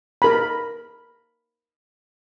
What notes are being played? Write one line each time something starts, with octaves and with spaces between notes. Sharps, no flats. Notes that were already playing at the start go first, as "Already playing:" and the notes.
A#4 B5